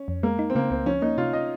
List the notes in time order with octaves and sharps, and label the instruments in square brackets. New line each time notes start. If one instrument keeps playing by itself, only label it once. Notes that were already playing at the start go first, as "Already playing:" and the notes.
Already playing: [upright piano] C#4
[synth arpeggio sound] F2
[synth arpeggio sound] G#3 [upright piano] A#3
[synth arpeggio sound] D#4
[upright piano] C4
[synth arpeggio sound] C#3 [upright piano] A#3
[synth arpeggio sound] C#2 [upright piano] C4
[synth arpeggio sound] F3 [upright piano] C#4
[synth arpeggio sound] A#3 [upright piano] D#4
[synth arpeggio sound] C3 [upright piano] F4
[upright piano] D#5